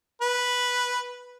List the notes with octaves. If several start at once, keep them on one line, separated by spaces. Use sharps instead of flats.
B4